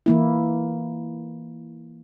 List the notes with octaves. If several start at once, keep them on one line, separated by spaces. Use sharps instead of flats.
E3 A#3 E4